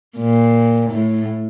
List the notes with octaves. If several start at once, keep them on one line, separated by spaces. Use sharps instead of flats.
A#2
A2